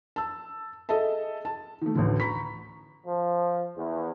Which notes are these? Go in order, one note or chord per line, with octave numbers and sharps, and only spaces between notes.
A5 E6
G#4 A4 D#5 E5 A5
A5
D#3 A3
A1 D2 D3
A#5 B5 C#6 B6
F3
E2